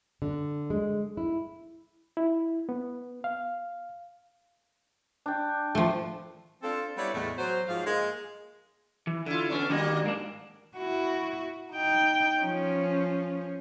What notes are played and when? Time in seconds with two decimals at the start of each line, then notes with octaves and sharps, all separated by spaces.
0.22 D3
0.70 G#3
1.17 E4
2.17 E4
2.69 B3
3.24 F5
5.26 D4 G5
5.75 F3 A3
6.63 C4 D4 F4 A4
6.98 G3 B3 E4 A4 C#5 D5
7.14 E2 A2 G#3 A3
7.38 F#3 C5
7.68 G#2 F3 F#3 F5
7.86 G#3 A#3
9.07 E3
9.26 D3 E4 F4
9.50 B3 C#4 D4
9.70 D#3 G3 A#3 D#4 F#4
10.04 G#2 A#3 D4
10.77 E4 F#4
11.73 D#4 G5
12.41 F3 C#4